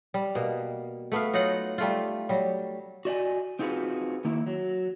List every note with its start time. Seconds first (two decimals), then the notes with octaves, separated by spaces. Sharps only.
0.14 G3
0.35 B2 A#3
1.12 A3 B3 E5 F5
1.34 F#3 D#4 F4 F#5
1.78 G3 A3 F4
2.29 F#3 G3
3.05 F#4 D5 D#5 G#5
3.59 C4 D#4 F4 F#4 G#4 B4
4.25 D#3 A#3 E4
4.47 F#3